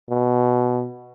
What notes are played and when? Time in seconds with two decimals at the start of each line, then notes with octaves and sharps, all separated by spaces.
0.10 B2